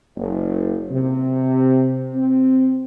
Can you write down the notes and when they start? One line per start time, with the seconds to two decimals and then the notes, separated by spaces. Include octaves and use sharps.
0.15 F#1
0.90 C3
2.14 C4